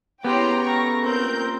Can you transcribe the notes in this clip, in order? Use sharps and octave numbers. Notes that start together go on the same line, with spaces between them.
C#3 B3 E4 G4 G5 A#5 C6
G#3 A4 F5 A#5 C#6
A#2 A#3 C4 A#4 G6